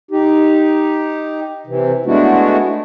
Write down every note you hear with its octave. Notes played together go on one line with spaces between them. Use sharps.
D#4 G4
C3 E3
G#3 A3 B3 D4 E4 F#4